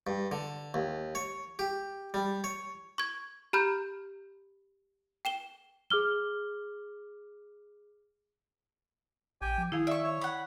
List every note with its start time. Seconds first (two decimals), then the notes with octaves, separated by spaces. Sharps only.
0.07 G2
0.32 D3
0.74 D#2
1.15 C#5
1.59 G4
2.14 G3
2.44 C#5
2.98 C#6 G#6
3.53 G4 A#5 B5 F6 G6
5.25 G5 E7 G7
5.90 G#4 D6 F6 G7
9.42 A#1 G4 G5 G#5
9.58 F3
9.72 D#3 E4 G#4 F5
9.87 D5 E5 C#6
10.04 C#5
10.21 F#5 B5